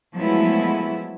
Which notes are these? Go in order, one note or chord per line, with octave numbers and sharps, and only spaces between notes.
F3 F#3 G#3 A3 B3 E4